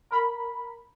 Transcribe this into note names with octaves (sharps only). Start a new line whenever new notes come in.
A#4 B5